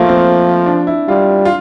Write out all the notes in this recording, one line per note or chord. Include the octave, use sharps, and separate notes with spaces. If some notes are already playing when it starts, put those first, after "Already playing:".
Already playing: F3 A3 A#3
C4
D4
E4
G3 F4
F4